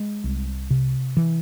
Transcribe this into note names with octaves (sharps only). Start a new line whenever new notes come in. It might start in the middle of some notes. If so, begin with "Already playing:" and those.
Already playing: G#3
C2
C3
E3